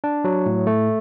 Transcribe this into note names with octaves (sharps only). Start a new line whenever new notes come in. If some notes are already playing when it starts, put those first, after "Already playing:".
D4
F#3
A2
A3